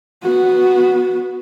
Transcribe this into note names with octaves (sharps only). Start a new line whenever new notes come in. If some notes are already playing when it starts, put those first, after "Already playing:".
B3 F#4